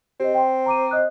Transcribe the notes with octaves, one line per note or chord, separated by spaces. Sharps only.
C4 G4 D#5
G5 C6
A#5 D6 D#7
D#5 D#6 F#6